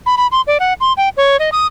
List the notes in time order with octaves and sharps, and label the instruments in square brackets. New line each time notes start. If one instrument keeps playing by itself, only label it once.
[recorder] B5
B5
C6
D5
F#5
C6
G5
C#5
D#5
D#6